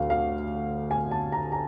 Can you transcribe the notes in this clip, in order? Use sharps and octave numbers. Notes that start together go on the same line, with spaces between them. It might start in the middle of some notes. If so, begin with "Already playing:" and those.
Already playing: D2 F5
F5
G#5
A5
A#5
A#5